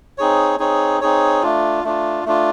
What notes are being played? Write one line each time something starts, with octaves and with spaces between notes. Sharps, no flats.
C4 D#4 G#4 C#5
C4 D#4 G#4 C#5
C4 D#4 G#4 C#5
A3 D4 F4
A3 D4 F4
A3 D4 F4